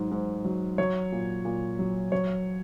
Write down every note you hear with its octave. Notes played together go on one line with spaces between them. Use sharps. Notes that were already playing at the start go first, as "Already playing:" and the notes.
Already playing: G#2 F#3
G#2
F#3
F#3 C#5
A#2
A#2
F#3
F#3 C#5